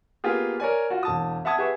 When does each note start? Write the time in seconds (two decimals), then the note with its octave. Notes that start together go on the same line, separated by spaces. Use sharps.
0.24 A#3 B3 F4 G4 G#4
0.60 A#4 C#5 D5 G#5
0.90 F4 F#4
1.03 E1 A5 D#6
1.45 E5 F#5 A5 D#6 G#6
1.58 G4 G#4 B4 E5 F#5 C#6